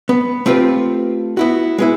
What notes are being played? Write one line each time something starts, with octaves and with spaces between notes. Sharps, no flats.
B3
A3 C4 F4 G4 B4
B3 E4 F#4
G#3 B3 E4